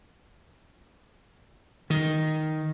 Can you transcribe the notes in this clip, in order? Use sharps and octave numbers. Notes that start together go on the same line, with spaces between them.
D#3